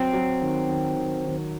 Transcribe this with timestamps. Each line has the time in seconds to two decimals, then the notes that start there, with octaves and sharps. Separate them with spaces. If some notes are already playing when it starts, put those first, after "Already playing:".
Already playing: F#3 C4
0.13 F#3
0.41 D#3
0.69 D#3
0.97 D#3
1.25 D#3